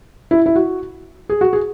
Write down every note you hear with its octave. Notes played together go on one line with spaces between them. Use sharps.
E4
E4
F#4
G#4
F#4
G#4